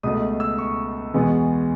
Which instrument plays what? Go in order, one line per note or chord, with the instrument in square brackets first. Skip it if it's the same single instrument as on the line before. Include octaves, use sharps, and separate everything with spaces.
[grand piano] C#2 B2 A3 D#6
E6
C#6
E2 B2 G#3 B3